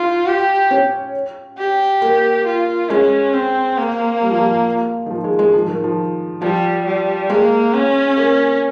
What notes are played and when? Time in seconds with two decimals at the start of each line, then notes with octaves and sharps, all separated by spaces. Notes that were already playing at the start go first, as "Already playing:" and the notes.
Already playing: D#4 F4
0.26 G4
0.71 C#4
1.58 G4
2.02 A#3
2.46 F4
2.90 G#3 C#4
3.34 C4
3.78 A#3
4.22 G3
4.31 F3
4.38 G3
5.06 D#3
5.10 F3
5.24 G#3
5.39 G#3
5.54 F3
5.68 D#3
5.84 F3
6.42 F3 G3
6.86 G3
7.30 G#3 A#3
7.74 C#4
8.17 A#3